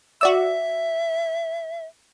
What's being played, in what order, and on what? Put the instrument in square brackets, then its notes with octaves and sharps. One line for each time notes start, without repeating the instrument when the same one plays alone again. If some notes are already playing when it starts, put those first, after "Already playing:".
[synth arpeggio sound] F#4 D5 E6 [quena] E5